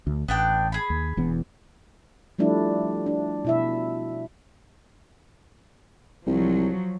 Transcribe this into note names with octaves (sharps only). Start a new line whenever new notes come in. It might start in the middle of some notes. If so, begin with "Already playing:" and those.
D2
A1 B3 D4 G5
G#4 B5
D#2
E1 E2 B3
F3 G3 A3 D4 E4
D4
B2 E4 E5
C2 F3 F#3